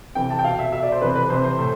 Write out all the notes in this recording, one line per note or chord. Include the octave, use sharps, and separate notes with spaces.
C3 E3 G5
A5
G5
B2 F5
E5
B2 E5
D5
C5
C3 E3 B4
B4
C3 E3 C5
C5
A2